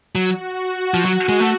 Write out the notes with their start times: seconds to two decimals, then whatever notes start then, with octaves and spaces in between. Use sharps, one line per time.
0.15 F#3 F#4
0.94 F3
1.05 F#3
1.29 G#3
1.40 A3